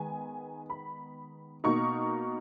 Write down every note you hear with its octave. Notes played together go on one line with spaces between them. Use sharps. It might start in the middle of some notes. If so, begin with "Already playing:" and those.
Already playing: D#3 G#3 B3 G#5
B5
B2 A#3 D#4 C#6